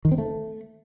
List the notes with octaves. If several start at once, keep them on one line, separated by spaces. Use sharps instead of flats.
D#3
C4
A3